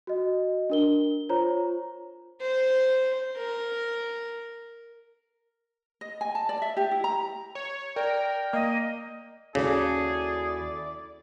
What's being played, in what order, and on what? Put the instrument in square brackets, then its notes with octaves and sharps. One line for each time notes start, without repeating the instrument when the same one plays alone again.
[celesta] F#4 D#5
D4 A#4 G7
F4 C5 C#5 A#5
[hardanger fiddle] C5
A#4
[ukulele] D#5
G#5
A5
D5
E5
G4
E4
A#5
[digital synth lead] C#5
[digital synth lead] A#4 [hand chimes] D5 [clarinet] G5
[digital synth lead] A#3 [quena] D#5
[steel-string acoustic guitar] D#2 F#4 A4 [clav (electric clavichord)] C#3 [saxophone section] E4 D5 [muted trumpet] G#4